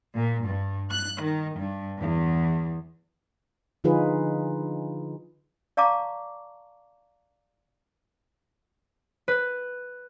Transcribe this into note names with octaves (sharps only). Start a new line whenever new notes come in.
A#2
G2
F#6
D#3
G2
E2
D3 F3 D#4 F4 G#4 B4
D5 F5 A5 A#5 C#6 D6
B4